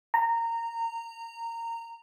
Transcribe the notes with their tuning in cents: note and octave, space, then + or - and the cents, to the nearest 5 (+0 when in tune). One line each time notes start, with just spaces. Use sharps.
A#5 -15